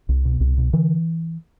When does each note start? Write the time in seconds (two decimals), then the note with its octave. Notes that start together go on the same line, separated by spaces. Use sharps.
0.09 C2
0.25 B2
0.40 C2
0.57 B2
0.73 D3 E3